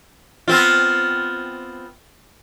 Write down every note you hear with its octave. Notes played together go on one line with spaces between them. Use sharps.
B3 C4 F4